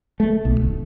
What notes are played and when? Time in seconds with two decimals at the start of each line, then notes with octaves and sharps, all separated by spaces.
0.20 A3
0.45 B1
0.62 D1